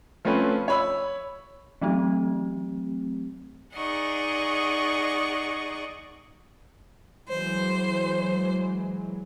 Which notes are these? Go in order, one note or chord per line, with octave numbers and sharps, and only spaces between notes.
F3 A3 C4 C#4 B4
C#5 B5 E6
E3 F#3 A3 C4 G4
D#4 G#4 D5 D#5 F#5 C#6
E3 F#3 G#3 C5